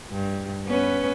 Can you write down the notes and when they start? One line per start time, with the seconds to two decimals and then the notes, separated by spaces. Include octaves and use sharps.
0.12 G2
0.66 B3 C#4 B4